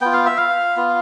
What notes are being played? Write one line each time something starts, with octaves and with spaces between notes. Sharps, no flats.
B3 F4 G5
F5
E5
F5
B3 F4